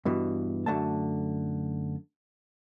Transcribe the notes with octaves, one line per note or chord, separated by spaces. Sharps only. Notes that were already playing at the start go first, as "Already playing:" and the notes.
G2 B2 E3
F#2 D3 A3 A5